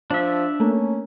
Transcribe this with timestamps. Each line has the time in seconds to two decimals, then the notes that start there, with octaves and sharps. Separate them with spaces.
0.11 F3 D4 E5
0.60 A3 A#3 C#4